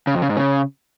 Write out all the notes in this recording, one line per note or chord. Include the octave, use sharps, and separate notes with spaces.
C#3
F2
C#3
G#2
C#3